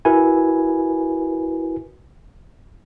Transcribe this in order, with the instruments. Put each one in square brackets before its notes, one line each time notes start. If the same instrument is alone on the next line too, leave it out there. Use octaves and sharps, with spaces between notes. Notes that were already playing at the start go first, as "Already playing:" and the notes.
[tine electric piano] E4 F#4 A#4 B4 G#5